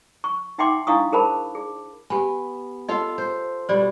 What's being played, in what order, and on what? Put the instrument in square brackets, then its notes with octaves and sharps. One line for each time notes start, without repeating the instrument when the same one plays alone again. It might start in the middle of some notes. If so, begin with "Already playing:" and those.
[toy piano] C#6
D#4 E5 F#5 G5 C6 D6
D4 E4 F5 C#6 D#6
G#4 A#4 C5 A5 B5
G#4
[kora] B3 [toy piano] G4 G#5
[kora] F4 A4 F5 [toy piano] D#5
[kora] C5
[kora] B2 G3 [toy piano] C5 D5